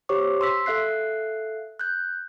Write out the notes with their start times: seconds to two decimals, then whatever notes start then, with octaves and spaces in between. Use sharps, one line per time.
0.09 G4 C5 C#5 C#6 D6
0.41 C6 E6 B6
0.66 A4 E5 F5 F#6 C7
1.79 F#6 G6